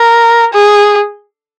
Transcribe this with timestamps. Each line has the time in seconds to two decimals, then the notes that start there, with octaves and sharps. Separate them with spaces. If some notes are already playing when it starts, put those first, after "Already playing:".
Already playing: A#4
0.53 G#4